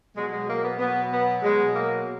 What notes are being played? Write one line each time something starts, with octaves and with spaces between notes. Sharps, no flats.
B2 F#3 G#3
G#3
A#3
B3
B2 F#3 B3
B3
B2 F#3 G#3
A#3